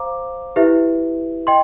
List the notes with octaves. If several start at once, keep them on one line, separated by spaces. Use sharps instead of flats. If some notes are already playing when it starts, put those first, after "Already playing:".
Already playing: C5 F5 A#5 D6
E4 G4 B4 E5
D#5 G5 C6